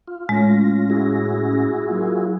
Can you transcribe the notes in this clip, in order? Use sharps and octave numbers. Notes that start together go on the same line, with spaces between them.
F4
A2 G#3 C#4 A#6
E4 F#4 G#4
F#3 A#3 F4